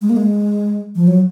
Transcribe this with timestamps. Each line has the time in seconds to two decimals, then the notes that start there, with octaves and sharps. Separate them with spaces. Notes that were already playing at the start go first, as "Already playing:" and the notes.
0.02 G#3
0.09 A#3
0.17 G#3
0.96 F3
1.07 F#3